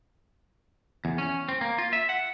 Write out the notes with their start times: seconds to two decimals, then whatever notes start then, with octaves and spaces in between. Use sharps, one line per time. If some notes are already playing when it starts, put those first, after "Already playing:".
1.05 E2
1.18 C#4
1.49 C4
1.61 A#3
1.78 F4
1.93 E5
2.09 F#5